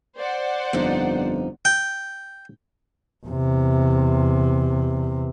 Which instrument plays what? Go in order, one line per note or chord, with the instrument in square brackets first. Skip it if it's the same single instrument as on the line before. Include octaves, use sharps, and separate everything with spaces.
[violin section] C5 D5 F#5
[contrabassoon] G1 [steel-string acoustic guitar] F2 D#4
[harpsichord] G5
[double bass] E2 C3